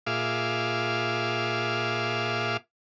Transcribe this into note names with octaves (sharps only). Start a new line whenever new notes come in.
A#2 F4 G#4 E5 F5 D6